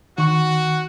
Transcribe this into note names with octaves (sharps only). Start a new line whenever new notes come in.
D#3 F#4